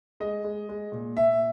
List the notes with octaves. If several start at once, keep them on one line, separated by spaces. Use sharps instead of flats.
G#3 D#5
G#3
G#3
A#2
A#2 E5